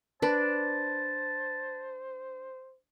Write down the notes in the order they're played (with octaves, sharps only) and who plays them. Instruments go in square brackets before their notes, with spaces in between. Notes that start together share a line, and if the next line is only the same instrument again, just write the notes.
[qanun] D4 [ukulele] B4 [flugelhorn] C5 [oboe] A5